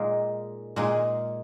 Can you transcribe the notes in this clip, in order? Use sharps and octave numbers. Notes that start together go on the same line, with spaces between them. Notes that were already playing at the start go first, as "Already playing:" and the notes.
Already playing: A#2 G#3 D#4 G#4
A#2 G#3 D#4 G#4